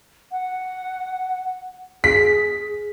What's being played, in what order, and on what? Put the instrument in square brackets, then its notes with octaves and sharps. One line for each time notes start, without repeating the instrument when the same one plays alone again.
[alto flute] F#5
[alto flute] G#4 [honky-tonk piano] B6